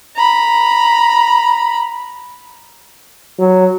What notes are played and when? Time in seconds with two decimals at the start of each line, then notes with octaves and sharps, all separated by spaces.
0.16 A#5 B5
3.39 F#3